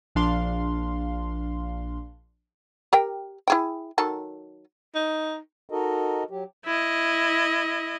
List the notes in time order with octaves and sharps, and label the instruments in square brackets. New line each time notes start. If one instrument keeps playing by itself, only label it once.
[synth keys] A#1 D4 F5 C6
[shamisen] G4 A#4 G5
E4 G#4 G5
D#3 F#3 A4
[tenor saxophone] D#4
[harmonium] D#4 F#4 A4 A#4 D#5
F#3 G4
[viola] E4 D#5